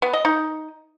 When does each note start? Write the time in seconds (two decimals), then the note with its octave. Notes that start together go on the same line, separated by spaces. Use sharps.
0.02 B3
0.13 D#5
0.25 D#4